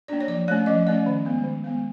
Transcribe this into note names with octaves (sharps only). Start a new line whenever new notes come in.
A#3 D4 D5
C#5
F3 D5
A3 C#4 C#5
F3 D#5
A3 C#4 D5
D#3
G#3 B3
D#3
G#3 B3